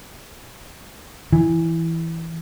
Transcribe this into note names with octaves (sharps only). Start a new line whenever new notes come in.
E3